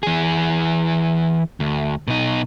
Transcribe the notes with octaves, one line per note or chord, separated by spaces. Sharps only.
E3 G#4
D2
B2 D#4